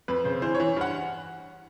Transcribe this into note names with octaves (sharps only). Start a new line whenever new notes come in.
F2 B4
C#3 C5
E3 C5
C#5
E3
G2 F#5